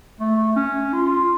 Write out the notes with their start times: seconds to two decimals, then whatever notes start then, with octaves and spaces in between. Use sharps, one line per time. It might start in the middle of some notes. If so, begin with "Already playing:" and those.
0.20 A3
0.56 C#4
0.93 F4